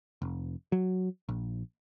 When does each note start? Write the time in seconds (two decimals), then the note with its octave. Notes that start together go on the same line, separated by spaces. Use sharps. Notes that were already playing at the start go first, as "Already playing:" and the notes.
0.22 F1
0.72 F#3
1.29 A#1